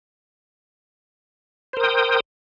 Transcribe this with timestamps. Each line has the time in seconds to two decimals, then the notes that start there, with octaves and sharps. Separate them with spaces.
1.73 C5
1.77 A#4
1.80 D#6
1.84 G5